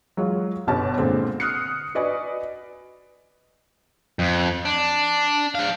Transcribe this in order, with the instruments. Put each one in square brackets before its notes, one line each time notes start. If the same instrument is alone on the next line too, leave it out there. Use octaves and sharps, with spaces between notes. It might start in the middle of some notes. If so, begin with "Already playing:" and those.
[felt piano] F#3 G#3 F4
G1 B2 C#4 G4 A5 A6
A#2 D3 G#3 C4
D#6 F6 F#6 C7 C#7
F#4 B4 D5 D#5 G#5
[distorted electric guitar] F2
D4
D4 F5